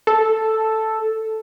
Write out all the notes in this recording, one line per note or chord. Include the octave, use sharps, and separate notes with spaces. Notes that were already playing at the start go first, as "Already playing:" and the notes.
A4